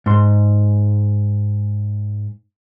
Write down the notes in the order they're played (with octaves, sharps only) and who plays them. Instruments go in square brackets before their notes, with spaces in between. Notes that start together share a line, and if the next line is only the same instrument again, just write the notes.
[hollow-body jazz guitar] G#2 C6